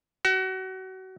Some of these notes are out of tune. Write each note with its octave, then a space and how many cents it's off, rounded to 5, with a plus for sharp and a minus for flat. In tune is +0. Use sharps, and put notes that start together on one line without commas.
F#4 +30